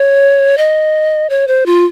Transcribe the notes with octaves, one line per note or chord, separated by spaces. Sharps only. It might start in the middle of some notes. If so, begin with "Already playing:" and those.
Already playing: C#5
D#5
C#5
C5
F4